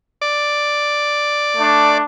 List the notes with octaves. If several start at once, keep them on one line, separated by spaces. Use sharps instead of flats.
D5
A3 D4